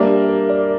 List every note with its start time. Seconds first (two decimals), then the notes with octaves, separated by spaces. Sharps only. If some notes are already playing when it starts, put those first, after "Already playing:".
Already playing: G3 A#3 D4 E5
0.10 G4
0.29 A#4
0.50 D5